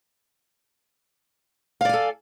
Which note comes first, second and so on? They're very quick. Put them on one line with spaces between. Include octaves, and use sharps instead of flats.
F5 D5 G#5 A4